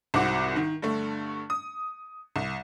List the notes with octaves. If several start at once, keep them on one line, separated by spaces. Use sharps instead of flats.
C2 G#2 C4 F#4 F#5 D6
D#3
G2 D3 A3
D#6
C2